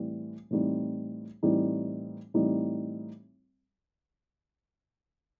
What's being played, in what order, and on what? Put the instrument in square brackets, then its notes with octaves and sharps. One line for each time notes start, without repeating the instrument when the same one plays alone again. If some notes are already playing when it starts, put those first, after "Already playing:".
Already playing: [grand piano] A2 E3 G3 C4
A2 E3 G3 C4 D#4
A2 E3 G3 C4 D#4
A2 E3 G3 C4 D#4